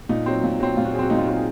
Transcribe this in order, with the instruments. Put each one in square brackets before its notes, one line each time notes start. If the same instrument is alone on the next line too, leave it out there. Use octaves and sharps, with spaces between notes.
[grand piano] A#2 D#4
F#3 C4
A#2
F#3 C4
A#2 F4
F#4
F#3 G#4
C4 F#4
A#2 D#4
F4
F#3 C4 F#4
G#4